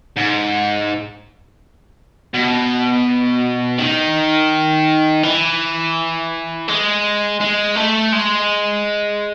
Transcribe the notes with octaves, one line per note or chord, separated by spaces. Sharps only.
G#2
B2
D#3
E3
G#3
G#3
A3
G#3